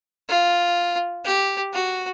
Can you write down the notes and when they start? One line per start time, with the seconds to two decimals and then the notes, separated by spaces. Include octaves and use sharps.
0.29 F4
1.25 G4
1.73 F#4